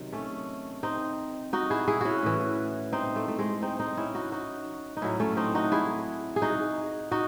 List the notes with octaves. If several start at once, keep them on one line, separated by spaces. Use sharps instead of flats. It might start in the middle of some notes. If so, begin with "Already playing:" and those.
Already playing: C3 D#3 F#3
A3 C#4
C4 D#4
D#4 F#4
E4 G#4
E4 G#4
C#4 E4 F#4
A2 E3
C4 D#4
A3
A3
G#3 C4
C4 D#4
C4 D#4
C#4 E4
D#4 F#4
D#4 F#4
D#4
A2 F#3 C#4 E4
A3 C#4
C4 D#4
D#4 F#4
E4 G#4
G#4
D#4 F#4
D#4 F#4